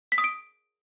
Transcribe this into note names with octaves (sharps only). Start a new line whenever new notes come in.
B6
D#6
D7